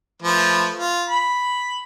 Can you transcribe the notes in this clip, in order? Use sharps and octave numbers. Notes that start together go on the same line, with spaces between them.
F3 A3 B4
F4
B5